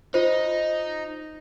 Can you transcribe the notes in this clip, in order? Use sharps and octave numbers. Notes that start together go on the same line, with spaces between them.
D#4 F4 C5